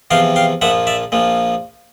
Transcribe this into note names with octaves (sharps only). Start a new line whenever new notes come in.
E2 C3 F3 F5 G5
F5 G5
A#1 A#2 F3 E5 F#5
D5 E5
A#1 A#2 F3